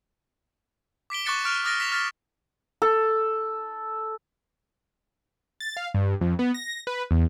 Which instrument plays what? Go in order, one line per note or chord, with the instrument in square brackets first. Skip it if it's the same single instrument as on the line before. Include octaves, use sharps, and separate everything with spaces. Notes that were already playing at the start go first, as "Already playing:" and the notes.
[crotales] D6 B6 D7 G7
C#6 D6 F#6 A6 C#7 E7
C#6 F6 D7 F7
D6 D#6 F6 A6 A#6 D7
B6 E7 F7 G7
F6 A6 B6
[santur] A4
[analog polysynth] A6
F5
G2
F2
B3
A#6
B4
E2